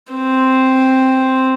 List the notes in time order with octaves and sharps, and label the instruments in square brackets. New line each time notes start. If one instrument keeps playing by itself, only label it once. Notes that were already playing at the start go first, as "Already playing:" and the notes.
[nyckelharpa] C4